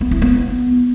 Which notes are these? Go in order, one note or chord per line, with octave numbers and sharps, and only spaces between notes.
B3
E4
B3